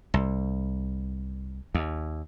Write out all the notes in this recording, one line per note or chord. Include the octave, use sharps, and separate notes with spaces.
C2
D#2